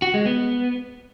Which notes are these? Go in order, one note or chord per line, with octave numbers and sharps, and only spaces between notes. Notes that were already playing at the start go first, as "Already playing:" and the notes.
F#4
G#3
B3